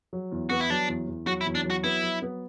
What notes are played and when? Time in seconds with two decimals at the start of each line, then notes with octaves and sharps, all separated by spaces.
0.13 F#3
0.32 E2
0.50 B3 F#4
0.60 E4
0.70 F#3 D4
0.88 E2
1.08 E2
1.27 F#3 F#4
1.41 E4
1.46 E2
1.55 D4
1.65 F#3
1.70 F#4
1.84 B3 E4
2.03 F#3
2.22 B3